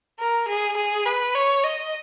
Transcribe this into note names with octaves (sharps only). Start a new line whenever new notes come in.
A#4
G#4
G#4
B4
C#5
D#5